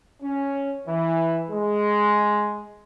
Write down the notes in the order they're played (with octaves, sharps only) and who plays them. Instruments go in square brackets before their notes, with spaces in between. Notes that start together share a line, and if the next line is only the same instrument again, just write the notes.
[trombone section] C#4
E3
G#3